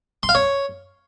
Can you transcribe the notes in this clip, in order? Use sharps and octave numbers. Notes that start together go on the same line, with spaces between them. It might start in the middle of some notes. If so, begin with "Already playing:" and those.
C6
F5
C#5